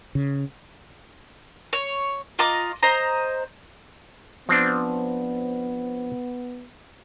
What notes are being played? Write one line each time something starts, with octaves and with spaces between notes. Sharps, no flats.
C#3
C#5
F4 D#5 A#5 D6
C5 D#5 A#5
F3 B3 C4 D4